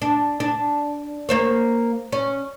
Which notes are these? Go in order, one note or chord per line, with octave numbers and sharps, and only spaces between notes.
D4
D4
A#3 C5 C#5
C#4